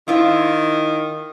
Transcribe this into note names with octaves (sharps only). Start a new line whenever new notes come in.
D#3 E4 F4 C5